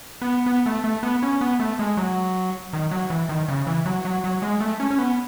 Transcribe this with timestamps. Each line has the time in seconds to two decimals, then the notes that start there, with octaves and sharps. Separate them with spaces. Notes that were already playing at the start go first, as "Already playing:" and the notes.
0.22 B3
0.46 B3
0.66 A3
0.84 A3
1.03 B3
1.23 C#4
1.41 B3
1.60 A3
1.79 G#3
1.97 F#3
2.73 D#3
2.91 F#3
3.10 E3
3.29 D#3
3.48 C#3
3.67 E3
3.86 F#3
4.05 F#3
4.24 F#3
4.42 G#3
4.60 A3
4.80 C#4
4.91 C#4
4.99 B3